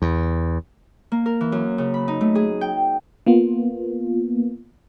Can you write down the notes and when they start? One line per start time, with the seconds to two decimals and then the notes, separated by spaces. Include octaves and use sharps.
0.02 E2
1.12 A#3
1.26 A#4
1.41 E3
1.52 F#2
1.78 C#3
1.94 B5
2.08 D#4
2.21 A3
2.35 G#4
2.61 G5
3.27 A#3 B3 F4